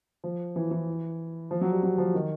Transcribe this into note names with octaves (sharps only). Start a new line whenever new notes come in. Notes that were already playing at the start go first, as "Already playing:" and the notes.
F3
E3
E3
F3
F#3
G3
F#3
F3
D#3